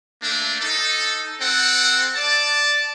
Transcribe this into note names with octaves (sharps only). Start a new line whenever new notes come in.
A3 A#3 D4
D#4 A4
C4 A4 F#5
D5 A5